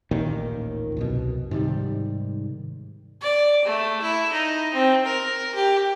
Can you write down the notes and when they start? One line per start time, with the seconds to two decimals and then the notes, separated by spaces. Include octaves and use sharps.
0.11 A1 D#2 A#2 D#3
0.97 C2 F#2 B2
1.51 G#2 C3 D#3 G3
3.22 D5
3.65 A3
4.01 E4
4.33 D#4
4.74 C4
5.06 A#4
5.55 G4